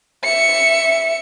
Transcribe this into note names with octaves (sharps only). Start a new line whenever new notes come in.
E5 C#7